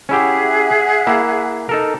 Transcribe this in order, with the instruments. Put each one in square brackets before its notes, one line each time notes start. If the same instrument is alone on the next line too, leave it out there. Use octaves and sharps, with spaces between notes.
[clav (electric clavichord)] C#4 E4 G4 [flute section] G#4 E5 F#5
[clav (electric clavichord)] A#3 E4
D#4 A4 A#4